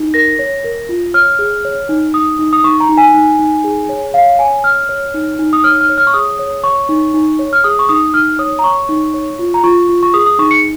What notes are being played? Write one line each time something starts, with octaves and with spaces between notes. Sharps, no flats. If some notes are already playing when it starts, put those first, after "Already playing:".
Already playing: D#4
A#4 A#6
C#5
A#4
F4
C#5 F6
G#4
C#5
D#4
D#4 D#6
D#4
D#6
D#4 C#6
A#5
D#4
G#5
D#4
D#4
G#4
C#5
C#5 F5
C#5 G#5
C#5 F6
C#5
D#4
D#4
D#6
C#5 F6
F6
C#5
F6
C#6
G#4 D#6
C#5
C#5 C#6
D#4
D#4
C#5
F6
G#4 D#6
C#6
D#4 D#6
D#4 F6
C#5 D#6
A#5
C#5 C#6
D#4
C#5
F4
A#5
F4 C#6
F4
C#6
G#4 D#6
D#6
D#4 C#6
C#7